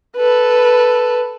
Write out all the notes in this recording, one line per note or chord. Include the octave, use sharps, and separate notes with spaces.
A4 B4